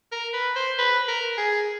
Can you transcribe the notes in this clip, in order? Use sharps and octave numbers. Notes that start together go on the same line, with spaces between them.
A#4
B4
C5
B4
A#4
G#4